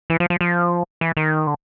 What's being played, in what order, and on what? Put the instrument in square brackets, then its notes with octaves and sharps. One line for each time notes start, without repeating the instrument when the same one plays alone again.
[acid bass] E3
F3
F3
F3
E3
D#3
D3